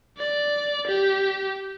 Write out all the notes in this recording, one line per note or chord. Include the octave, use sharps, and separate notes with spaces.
D5
G4